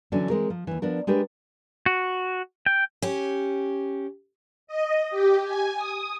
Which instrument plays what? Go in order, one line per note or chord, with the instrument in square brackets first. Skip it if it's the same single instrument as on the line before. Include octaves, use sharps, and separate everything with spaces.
[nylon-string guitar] D3 E3 F#3 C#4 D4
E3 G#3 C4 A#4
F3
D#2 E3
F3 B3 D4 A#4
G#3 D4 G4 A#4 B4
[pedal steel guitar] F#4
G5
[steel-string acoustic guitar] C#4 G4
[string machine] D#5
G4
G#5
D#6